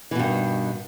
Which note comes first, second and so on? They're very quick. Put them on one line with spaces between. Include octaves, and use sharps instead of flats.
E3 B2 G2 D#3